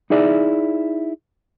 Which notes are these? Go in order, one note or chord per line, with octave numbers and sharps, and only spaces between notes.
D#4 E4 G#4 D5 E5